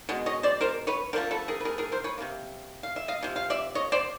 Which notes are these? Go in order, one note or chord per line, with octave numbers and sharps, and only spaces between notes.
B2 G#3
C#5 D#5
C5 D5
A#4 C5
B4 C#5
D3 F3 A3 A#4 C5
A4 B4
G#4 A#4
B4
G#4 A#4
G#4 A#4
A#4 C5
B4 C#5
C3 F3 A#3
F5
E5
D#5 F5
C3 F3
F5
D5 E5
C#5 D#5
C5 D5